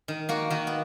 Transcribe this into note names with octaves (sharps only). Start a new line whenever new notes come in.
D#3
A#3 F#4
D#3 F#4
B3